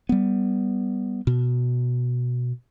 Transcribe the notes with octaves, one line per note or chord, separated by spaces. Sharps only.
G3 B3
B2